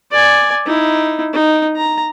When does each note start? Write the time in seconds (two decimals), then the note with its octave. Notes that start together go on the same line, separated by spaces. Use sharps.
0.12 D5 G#5
0.66 D#4 E4
1.33 D#4
1.76 A#5